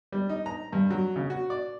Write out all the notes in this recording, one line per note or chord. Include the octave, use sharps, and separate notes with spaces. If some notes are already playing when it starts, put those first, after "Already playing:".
G3
D#4
A#5
G2
F#3
C#3
F#4
D5